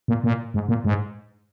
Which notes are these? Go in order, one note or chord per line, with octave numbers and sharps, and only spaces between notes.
A#2
A#2
G#2
A#2
G#2